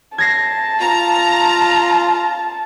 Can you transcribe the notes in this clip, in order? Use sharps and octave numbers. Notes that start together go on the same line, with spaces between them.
A5 G#6 A#6 C7
F4 A#5